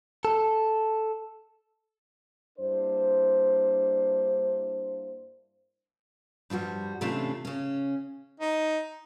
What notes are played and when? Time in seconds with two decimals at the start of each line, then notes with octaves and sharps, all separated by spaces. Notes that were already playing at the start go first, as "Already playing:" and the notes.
0.25 A4
2.59 G2 A#3 D4 E4 C5
6.50 G2 F3 G3 F#4
7.01 C3 E3 A3 C#4 D4 F4
7.45 C#3 C#4
8.40 D#4